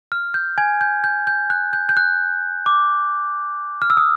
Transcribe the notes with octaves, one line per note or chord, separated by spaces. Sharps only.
F6
G6
G#5 G#6
G6
G6
G6
F#6
G6
G6
F#6
D6
F6
E6
D#6